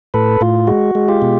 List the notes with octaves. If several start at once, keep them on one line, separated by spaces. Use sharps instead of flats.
A2 A4 B4
A2 F4
G#3 F#4
G#3
F4 G4
B2